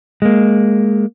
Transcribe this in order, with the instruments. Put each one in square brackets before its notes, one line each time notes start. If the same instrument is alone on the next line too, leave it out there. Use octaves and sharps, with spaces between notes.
[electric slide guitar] G#3 A#3